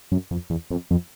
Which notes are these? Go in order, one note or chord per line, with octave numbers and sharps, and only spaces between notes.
F#2
F2
E2
F2
F2